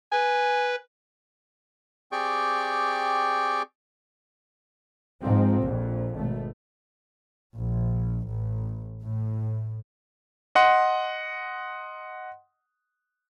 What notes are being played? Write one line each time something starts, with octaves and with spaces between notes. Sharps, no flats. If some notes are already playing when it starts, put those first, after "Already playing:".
B4 G#5
C4 G4 G#4 D5 G5 C#6
G#2 F3 C4
A#1 F2 A#2
G#1 B2 A3
A#1
A1
A2
D#5 F#5 C6